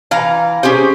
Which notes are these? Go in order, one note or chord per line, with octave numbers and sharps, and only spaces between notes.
E3 F5 A#5
C#4 G4 G#4 C5